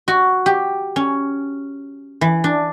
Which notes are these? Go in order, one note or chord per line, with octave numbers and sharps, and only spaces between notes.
F#4
G4
C#4
E3
D4